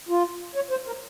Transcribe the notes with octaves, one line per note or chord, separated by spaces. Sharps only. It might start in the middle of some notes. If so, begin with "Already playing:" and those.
F4
C#5
C5
A#4